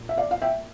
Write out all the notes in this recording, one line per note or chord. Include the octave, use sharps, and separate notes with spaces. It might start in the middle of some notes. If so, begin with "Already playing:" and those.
Already playing: A#2
E5
D5 F5
F5
E5 G5